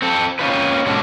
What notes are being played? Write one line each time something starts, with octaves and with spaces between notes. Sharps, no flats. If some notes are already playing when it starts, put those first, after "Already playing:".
C4 A4
A#3 C4 C#4 D#4 F4 B4
G#2 B2 D3 C#4 D4 F#4